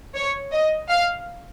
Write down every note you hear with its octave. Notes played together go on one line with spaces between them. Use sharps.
C#5
D#5
F5